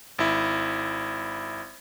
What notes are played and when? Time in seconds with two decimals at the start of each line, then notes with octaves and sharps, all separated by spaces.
0.19 G#1 E4